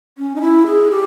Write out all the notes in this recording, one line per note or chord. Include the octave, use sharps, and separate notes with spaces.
C#4
D#4
E4
G#4
G4